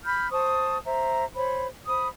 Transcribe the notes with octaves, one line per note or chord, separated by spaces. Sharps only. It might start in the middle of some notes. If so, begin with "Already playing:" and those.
B5 F6 G6
C5 A5 C#6 D#6
C5 E5 A#5
C5 C#5 B5
C5 B5 D#6